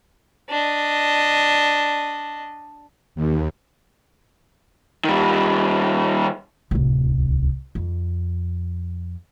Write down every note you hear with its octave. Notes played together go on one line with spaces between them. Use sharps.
D4 D#5
D#2
D#3 G3
D1 C2
F2